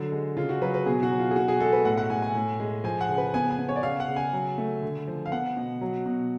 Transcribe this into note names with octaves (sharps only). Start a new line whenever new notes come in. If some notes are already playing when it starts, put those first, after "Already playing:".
Already playing: D3 F#3
G#3
C#3 F4
F#4
F#3 B4
B4
B2 G#4
F#4
F#3
F4
G#4
B2 F#4
G#4
G#3 A4
B4
A2 F#5
F#5
A2 G#5
G#5
A2
G#3
F3 G#5
F#5
C#3
B4
B3 G#5
G#5
B3
C#5
D5
C#3 F5
F#5
C#3
G#5
F#3
A3
D3
F3
F5
B3 F#5
B2
F#3
B2